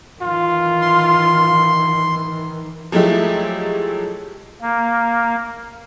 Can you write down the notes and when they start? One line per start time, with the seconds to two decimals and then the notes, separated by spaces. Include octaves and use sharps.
0.22 D#3 E3 F4
0.81 C6
2.92 F3 F#3 G#3 A3 E4 G4
4.61 A#3